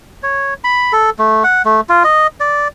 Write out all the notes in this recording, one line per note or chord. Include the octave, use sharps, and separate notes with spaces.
C#5
B5
A4
A3
F#5
A3
F4
D#5
D5